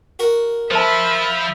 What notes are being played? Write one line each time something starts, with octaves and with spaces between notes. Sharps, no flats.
F#4 A#4
F3 C5 E5 A5 B5